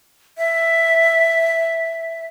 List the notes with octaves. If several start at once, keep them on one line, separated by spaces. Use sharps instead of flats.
E5